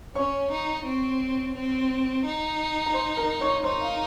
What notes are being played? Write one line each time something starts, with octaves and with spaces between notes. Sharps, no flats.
C#4 C#5 C#6
D#4
C4
C4
D#4
A#5
C5 C6
A#4 A#5
C#5 C#6
D#4 C5 C6
F5